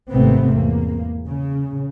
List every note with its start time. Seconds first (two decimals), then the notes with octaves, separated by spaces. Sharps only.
0.10 G#1 G#2 C3 A3 B3 C4
0.54 E2 A#3
1.28 C#3